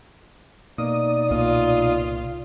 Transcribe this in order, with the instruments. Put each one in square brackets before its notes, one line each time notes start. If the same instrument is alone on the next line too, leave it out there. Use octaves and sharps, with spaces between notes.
[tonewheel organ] B2 D#4 D#6 [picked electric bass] A#3 [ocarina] D5
[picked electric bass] C2 A#2 A#3 [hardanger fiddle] F4